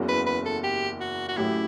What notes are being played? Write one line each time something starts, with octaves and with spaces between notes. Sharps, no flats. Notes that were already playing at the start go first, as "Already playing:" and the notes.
Already playing: F#1 E2 C#3 F#3
B4
B4
A4
G4
F#4
F#4
A1 A2 F#3 C#4 E4 G4